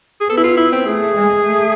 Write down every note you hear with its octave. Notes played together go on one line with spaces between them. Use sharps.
G#4
B3 A4
E4
F4
E4
C4
A3 G#4
G#3
A3